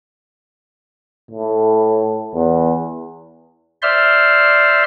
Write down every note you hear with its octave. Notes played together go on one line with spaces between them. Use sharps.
A2
E2
C5 D5 E5 C6 F6